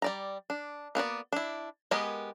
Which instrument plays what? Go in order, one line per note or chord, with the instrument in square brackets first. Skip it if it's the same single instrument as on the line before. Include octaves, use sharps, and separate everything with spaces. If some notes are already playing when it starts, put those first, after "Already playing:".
[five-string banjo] G3 D5 A#5
D4
A#3 B3 F#4 D5
D4 E4
G#3 B3 G4 A#4 G#5